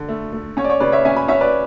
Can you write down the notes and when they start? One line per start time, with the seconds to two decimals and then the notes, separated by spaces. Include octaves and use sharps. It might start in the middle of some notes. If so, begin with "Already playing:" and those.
Already playing: D3
0.09 A3
0.33 A3
0.57 C#4 C#5
0.64 D5
0.70 C#5
0.80 C#3 B4 D5
0.92 C#5 E5
1.05 C#4 E5 G#5
1.16 G#5 B5
1.28 C#4 C#5 E5
1.41 B4 D5